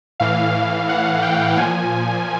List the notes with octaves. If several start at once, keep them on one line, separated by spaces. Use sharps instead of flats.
A2 E3 F5
F5
F#5
G5
A#2 F3 G#5